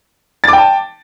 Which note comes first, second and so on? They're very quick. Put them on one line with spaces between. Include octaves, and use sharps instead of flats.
A6 D6 G5 A5